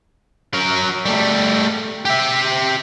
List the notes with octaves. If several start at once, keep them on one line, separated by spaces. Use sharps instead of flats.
F#3 A#4
G3 A3
G4 E5